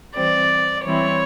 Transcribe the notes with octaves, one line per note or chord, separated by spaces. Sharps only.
E3 G3 C4 D5
E3 G3 C4 E4 C#5